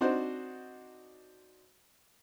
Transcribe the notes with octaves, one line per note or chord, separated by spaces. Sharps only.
C4 D4 D#4 F#4 C5